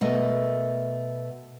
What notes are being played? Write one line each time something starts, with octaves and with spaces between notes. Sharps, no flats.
B2 A3 A#4 D#5